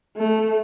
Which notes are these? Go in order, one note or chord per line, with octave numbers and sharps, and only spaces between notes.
A3